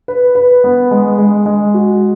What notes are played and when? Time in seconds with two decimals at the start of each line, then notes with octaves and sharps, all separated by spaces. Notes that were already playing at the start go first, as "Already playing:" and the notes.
0.08 B4
0.35 B4
0.64 B3
0.91 G#3
1.18 G#3
1.46 G#3
1.74 F#4